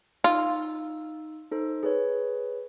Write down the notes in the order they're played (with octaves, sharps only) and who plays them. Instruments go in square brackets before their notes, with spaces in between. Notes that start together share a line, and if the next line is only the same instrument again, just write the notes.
[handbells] D#4 E6 [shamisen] F4
[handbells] D#4 A4 C5
G#4 B4 C#5